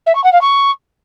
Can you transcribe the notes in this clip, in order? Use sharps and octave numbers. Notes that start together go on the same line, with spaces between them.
E5
C#6
F#5
F5
C#6